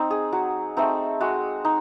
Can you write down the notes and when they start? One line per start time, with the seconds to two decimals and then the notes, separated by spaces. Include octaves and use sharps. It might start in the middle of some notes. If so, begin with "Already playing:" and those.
Already playing: C4 D#4
0.11 G#4
0.33 F#3
0.77 A3 C4 D#4
1.21 G#3 F#4
1.65 D#4